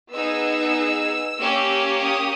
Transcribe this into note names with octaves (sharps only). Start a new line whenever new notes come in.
B3 D#4 G#4 E6
A#3 C#4 G4
D#6